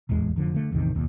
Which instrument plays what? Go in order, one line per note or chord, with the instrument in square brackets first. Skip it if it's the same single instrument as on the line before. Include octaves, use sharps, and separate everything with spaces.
[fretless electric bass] D#1 A1 E2 G#3
F1 D3 F3
D3 A3
A1 E2 C3 D#3
F1 D#2 A#2